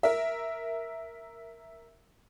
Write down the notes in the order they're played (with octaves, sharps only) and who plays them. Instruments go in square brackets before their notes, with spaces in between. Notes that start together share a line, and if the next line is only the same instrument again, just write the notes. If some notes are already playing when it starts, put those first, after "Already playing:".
[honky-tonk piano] A#4 E5